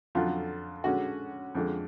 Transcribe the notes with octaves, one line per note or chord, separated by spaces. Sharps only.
F2 D3 F#3 F4
D3 G#3 C#4 F#4
F2 D3 G#3